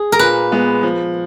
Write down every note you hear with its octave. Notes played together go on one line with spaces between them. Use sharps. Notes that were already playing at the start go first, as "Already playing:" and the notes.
Already playing: G#4
A#4
A#2 B4
G#3 B3
F3